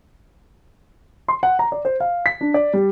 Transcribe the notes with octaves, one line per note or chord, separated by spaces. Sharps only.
C6
F#5
A#5
D5
C5
F5
B6
D4
D5
G3